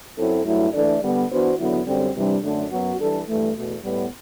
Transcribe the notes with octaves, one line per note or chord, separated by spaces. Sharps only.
F#2 F#3 C4 E4 A4
G2 F#3 A3 E4
E3 A3 D4 A4 D5
D3 G3 B3
E3 B3 D4 F#4 C5
E2 D3 F#3 B3 E4
F#2 D3 G3 C4
C3 E3 G3 D4
F#2 D3 A3 D4
F#2 F#3 B3 F#4
E3 G3 D4 A4
G2 E3 A3
E2 B2 A3
A2 G3 B3